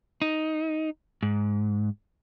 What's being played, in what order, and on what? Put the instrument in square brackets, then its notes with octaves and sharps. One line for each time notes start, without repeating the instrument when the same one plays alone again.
[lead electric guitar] D#4
G#2